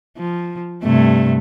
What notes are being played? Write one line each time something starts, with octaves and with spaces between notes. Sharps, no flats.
F3
G2 C3 A3